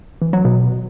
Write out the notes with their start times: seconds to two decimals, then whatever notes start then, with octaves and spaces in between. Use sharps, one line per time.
0.22 E3
0.33 F#3
0.45 B2